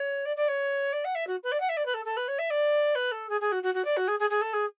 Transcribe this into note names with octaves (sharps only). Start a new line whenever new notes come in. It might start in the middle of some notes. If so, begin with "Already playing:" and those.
Already playing: C#5
D5
D5
C#5
D5
F#5
E5
F#4
B4
D5
F#5
E5
D5
B4
A4
A4
B4
C#5
E5
D5
B4
A4
G#4
G#4
F#4
F#4
F#4
D5
F#4
G#4
G#4
G#4
A4
G#4